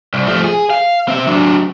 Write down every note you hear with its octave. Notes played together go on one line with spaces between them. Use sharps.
C2
F3 A3
G#4
F5
C4 E5
F#3 D4